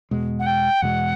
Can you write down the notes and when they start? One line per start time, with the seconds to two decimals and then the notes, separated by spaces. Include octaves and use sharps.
0.11 E2 B2 G#3
0.40 F#5
0.46 G5
0.82 E2 B2 G#3 F#5